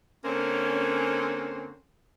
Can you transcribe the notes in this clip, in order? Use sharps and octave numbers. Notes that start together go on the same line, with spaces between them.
D3 A#3 C4 C#4